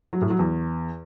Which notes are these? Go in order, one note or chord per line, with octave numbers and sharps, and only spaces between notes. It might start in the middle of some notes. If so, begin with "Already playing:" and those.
F#3
A2
F#3
E2